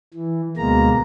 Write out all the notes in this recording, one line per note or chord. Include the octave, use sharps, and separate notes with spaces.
E3
D2 B2 G#3 A#3 A#5